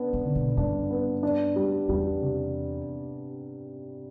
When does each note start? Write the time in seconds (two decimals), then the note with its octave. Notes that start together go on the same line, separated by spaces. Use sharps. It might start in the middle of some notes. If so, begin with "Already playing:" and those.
Already playing: B3 D4
0.13 C3
0.25 D3
0.35 B2
0.57 G2 D4
0.90 B3
1.23 D4
1.56 G3
1.88 E2 G3
2.21 C3